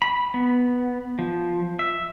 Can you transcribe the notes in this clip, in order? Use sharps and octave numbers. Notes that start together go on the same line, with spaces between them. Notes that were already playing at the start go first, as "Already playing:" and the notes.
B5
B3
F3
E5